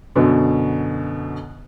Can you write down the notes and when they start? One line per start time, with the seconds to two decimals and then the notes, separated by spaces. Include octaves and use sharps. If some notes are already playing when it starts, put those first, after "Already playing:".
0.16 F#2 B2 D3